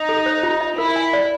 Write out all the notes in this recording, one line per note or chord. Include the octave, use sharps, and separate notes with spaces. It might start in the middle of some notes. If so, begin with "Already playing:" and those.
Already playing: D#4
A4
C5
F4
D#5
E4 A#4
G#5
D5